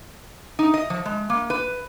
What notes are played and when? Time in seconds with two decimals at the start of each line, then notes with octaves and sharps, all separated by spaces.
0.59 D#4
0.74 D#5
0.90 F3
1.06 G#3
1.30 A#3
1.50 B4